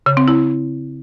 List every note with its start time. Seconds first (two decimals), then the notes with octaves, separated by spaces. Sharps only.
0.06 C#3
0.17 C4
0.28 E4